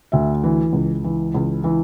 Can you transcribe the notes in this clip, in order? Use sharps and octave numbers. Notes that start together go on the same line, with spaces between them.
D2 E5
E3
C#2
E3
C#2
E3